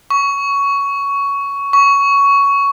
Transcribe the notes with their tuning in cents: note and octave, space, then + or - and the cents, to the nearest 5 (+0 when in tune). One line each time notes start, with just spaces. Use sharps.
C#6 +15
C#6 +15